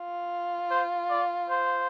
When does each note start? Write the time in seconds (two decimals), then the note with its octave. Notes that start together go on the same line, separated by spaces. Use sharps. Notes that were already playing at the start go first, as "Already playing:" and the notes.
Already playing: F4
0.71 C5
1.10 D5
1.50 C5